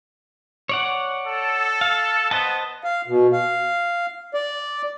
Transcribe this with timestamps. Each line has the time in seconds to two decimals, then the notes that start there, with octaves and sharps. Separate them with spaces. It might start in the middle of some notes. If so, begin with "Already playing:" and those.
0.69 C#5 D5 F#5
1.28 A4
1.81 F5
2.31 B3 C5 D#5 A5
2.84 F5
3.08 B2
3.33 F5
4.34 D5